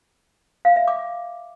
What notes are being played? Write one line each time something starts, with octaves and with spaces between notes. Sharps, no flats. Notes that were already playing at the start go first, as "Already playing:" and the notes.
F5
E5
D6